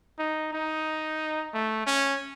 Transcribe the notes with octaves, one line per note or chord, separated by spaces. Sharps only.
D#4
D#4
A3
C#4